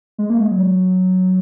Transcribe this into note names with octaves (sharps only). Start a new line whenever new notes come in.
G#3
A#3
G#3
F#3